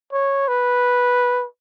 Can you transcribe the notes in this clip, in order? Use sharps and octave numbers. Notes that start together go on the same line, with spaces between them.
C#5
B4